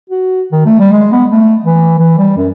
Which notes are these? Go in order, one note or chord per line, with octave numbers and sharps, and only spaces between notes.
F#4
D#3
A3
G3
G#3
B3
A3
E3
E3
G3
F#2